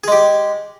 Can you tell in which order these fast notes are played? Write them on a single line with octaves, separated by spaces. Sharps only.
G#4 G#3 G4